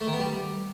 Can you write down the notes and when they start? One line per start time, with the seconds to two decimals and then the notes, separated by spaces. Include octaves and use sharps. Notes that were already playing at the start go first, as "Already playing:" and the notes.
0.01 A3
0.07 D#3
0.13 B3
0.19 G3